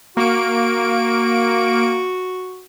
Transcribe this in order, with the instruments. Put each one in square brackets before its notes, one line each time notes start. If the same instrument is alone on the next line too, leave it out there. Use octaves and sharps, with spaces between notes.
[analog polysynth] A#3 D7 [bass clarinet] F#4